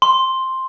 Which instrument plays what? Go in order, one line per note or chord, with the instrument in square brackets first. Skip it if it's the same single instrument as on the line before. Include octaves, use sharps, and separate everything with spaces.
[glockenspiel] C6